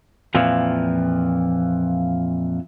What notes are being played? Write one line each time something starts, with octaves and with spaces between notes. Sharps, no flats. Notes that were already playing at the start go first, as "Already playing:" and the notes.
F2 A#2 E3 F3